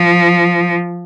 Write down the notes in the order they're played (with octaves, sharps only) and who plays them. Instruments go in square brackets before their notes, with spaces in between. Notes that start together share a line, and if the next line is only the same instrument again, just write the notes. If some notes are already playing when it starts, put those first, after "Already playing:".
Already playing: [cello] F3